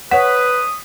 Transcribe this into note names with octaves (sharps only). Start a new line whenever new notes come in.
B4 C#5 F#5 D#6 B6